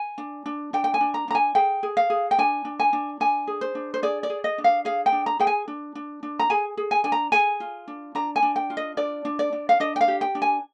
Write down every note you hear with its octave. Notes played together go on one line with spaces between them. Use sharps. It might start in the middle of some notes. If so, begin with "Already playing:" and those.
Already playing: G#5
D4
D4
D4 G5
G5
G#5
D4
A#5
D4 A#5
G#5
G#4 G5
G#4
F5
G#4
G5
D4 G#5
D4
G#5
D4
D4 G#5
G#4
C5
D4
C5
G#4 D5
D5
G#4
D#5
D4
F5
G#4 F5
G5
D4
A#5
G#4 G5
G#5
D4
D4
D4
A#5
G#4 G#5
G#4
G#5
D4 G#5
A#5
G#4 G#5
F4
D4
D4 A#5
G#5
D4
G5
F4
D#5
D4 D5
D4
D5
D4
F5
D4 D#5
G5
F5
G4
G5
D4
G#5